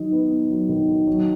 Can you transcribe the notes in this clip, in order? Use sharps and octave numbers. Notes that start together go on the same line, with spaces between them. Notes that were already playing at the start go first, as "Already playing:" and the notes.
Already playing: D#3 F#3 D#4
B3
B3
F#3
D#3
D#3
F#3